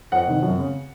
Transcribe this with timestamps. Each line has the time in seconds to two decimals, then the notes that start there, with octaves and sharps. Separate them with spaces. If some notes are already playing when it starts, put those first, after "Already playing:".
0.12 F2 F#5
0.28 C3 D#3
0.43 F#2
0.58 C#3